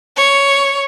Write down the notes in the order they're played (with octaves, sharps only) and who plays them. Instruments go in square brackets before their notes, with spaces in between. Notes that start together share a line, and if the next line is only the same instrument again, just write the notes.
[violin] C#5